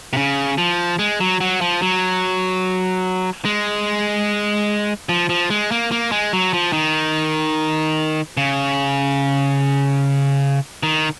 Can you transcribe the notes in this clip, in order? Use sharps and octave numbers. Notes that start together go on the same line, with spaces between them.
C3
C#3
F3
G#3
F#3
F#3
F3
F#3
G#3
F3
F3
G#3
A#3
A#3
G#3
F#3
F3
D#3
C#3
D#3